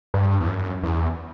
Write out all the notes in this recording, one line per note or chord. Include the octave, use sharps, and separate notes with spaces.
G2
E2
F#2
E2